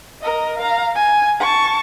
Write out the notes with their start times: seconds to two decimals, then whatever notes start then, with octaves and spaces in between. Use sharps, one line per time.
0.21 A#4 D#5
0.58 F5 A#5
0.95 G#5
1.40 A5 C#6